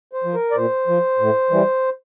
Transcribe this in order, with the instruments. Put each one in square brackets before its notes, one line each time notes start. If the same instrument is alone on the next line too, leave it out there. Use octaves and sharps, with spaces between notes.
[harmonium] C5
F3
A#4
D5
A#2 C5
F3
A2
E3 G3